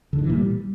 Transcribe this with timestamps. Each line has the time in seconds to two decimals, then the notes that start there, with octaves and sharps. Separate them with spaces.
0.13 D3
0.18 D#3
0.24 E3
0.29 A#2
0.35 G3